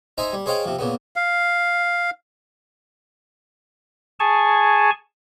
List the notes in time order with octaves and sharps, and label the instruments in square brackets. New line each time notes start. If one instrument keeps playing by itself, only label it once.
[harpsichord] D#4 C5 E5 G#5 A#5
G3
G#4 C5 C#5 D#5 F5 G5
C3 F3
A#2 C#3 B3
[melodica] F5
[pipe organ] G#4 G#5 A5 C#6